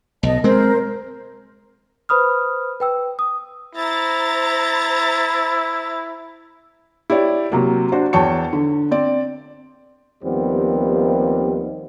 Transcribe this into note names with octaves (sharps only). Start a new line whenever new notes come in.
B1 D#5 A5
G#3 C4 A#4 C5
B4 C5 B5 D#6 F6
B4 G5 E6
D#6
E4 C5 A#5 A6
E4 G4 C#5 D5
C3 F#3 A#3
D4 F#4 C5
E2 C#5 G5 A5 C#6 C#7
D3
C4 D5
D#2 F3 G3 B3 C4